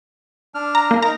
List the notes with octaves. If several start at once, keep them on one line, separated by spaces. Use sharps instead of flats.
D4 F6
A#5
A#3
D#4 A#4 A#5